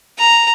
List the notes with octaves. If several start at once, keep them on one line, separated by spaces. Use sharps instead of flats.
A#5